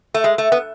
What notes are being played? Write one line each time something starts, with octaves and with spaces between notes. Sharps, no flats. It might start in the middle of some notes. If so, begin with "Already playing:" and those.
A3
G#3
A3
B3